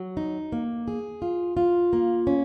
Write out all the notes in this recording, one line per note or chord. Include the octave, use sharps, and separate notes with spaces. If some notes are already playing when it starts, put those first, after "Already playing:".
Already playing: F#3
D#4
A#3
G#4
F4
F4
A#3
C#4